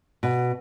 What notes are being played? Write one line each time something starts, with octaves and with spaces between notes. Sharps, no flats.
B2